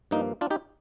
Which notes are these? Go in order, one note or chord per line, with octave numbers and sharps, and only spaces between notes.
G2 F3 A#3 D#4
D4 F4
D#4 G4